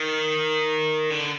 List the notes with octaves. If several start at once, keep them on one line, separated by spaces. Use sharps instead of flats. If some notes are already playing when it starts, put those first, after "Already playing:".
Already playing: D#3
D3